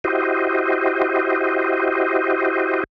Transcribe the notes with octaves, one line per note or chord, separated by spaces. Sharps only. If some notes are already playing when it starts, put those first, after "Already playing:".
E4 F#4 G4 C5 D#5